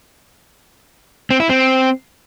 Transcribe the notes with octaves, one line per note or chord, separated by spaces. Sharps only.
C4
E4
C4